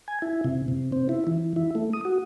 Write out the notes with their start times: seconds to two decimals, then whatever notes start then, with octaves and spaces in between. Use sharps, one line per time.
0.08 G#5
0.22 E4
0.44 C3
0.68 C3
0.92 C4
1.09 E4
1.27 E3
1.56 E4
1.75 A3
1.93 D#6
2.05 F#4